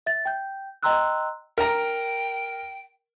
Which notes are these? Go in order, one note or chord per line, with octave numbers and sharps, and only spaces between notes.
E5 A6
G5 G6
D#5 G5 A#5 C6 E6 F#6
A#4 G5 A#5